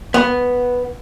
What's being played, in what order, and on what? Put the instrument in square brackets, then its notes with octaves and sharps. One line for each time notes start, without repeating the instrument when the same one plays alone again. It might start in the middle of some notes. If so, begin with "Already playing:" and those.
[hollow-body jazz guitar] B3